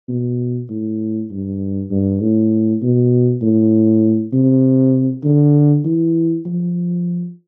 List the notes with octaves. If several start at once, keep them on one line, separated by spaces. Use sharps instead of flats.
B2
A2
G2
G2
A2
B2
A2
C3
D3
E3
F3